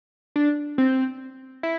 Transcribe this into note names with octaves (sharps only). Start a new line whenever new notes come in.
D4
C4
E4